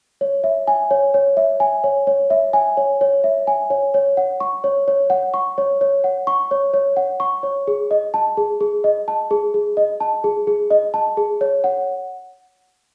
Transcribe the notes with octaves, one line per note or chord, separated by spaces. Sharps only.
C#5
E5
G#5
C#5
C#5
E5
G#5
C#5
C#5
E5
G#5
C#5
C#5
E5
G#5
C#5
C#5
F#5
C#6
C#5
C#5
F#5
C#6
C#5
C#5
F#5
C#6
C#5
C#5
F#5
C#6
C#5
G#4
D#5
A5
G#4
G#4
D#5
A5
G#4
G#4
D#5
A5
G#4
G#4
D#5
A5
G#4
C#5
F#5